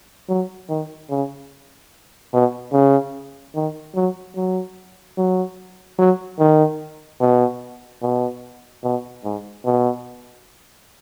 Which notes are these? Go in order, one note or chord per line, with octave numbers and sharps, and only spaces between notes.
F#3
D#3
C#3
B2
C#3
D#3
F#3
F#3
F#3
F#3
D#3
B2
B2
B2
G#2
B2